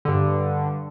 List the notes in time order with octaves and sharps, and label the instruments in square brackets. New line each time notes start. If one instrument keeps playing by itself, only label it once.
[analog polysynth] G2 D3